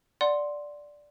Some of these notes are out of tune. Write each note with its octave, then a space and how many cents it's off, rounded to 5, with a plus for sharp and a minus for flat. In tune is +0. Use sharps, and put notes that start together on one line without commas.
D5 +0 F#5 +0 C6 +0